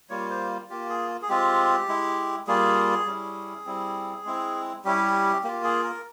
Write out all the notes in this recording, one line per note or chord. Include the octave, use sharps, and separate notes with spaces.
G3 A#3 F4 C#5
C5
A#3 F4 G4
G#4
G#4
G#3 C4 F4 G4
G#3 E4
G3 A#3 F4 G#4
G3 C#4 E4
G3 C4 E4
G#3 C4 E4
G3 C#4 E4 G4
A#3 F4 G4
G#4
A#4